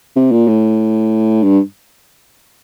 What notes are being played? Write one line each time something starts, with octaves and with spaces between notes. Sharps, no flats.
C3
A#2
A2
G2